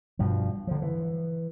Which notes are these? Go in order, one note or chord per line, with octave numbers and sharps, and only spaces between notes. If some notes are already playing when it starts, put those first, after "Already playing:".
G2 B2 F3
D3 F3
E3